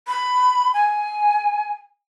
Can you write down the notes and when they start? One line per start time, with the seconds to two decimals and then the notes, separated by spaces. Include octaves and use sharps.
0.07 B5
0.74 G#5